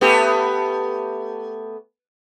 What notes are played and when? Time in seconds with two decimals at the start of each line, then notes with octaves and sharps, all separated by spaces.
0.01 A3 B3 G4